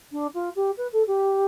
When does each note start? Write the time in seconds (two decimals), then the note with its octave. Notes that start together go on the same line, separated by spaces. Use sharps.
0.12 D4
0.34 F4
0.56 G4
0.77 B4
0.93 A4
1.07 G4